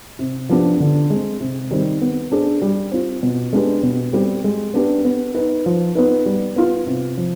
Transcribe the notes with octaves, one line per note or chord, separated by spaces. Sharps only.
C3
F3 B3 D4 G4
D3
G#3 C4
C3
D#3 G3 C4
B3
D4 G#4 C5
G3
C4 F4
B2
G#3 D4 G4 B4
B2
G3 C4 G4
G#3
B3 D4 G4 B4
B3
D#4 B4
F3
B3 D#4 B4
G3
B3 F4 B4
C3
F3